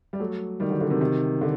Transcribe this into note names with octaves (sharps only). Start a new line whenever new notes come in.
G3
F#3 A3
D#3 G3
D3 F#3
D3
C3 D#3
C3 D#3
D3